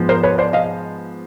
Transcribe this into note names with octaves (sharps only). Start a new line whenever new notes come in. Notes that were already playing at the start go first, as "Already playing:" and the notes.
Already playing: G#2 F3 G#3 B3
A#4 C5
B4 C#5
C5 D5
D#5 F5